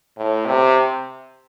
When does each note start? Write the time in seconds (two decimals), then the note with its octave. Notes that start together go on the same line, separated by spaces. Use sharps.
0.17 A2
0.46 C3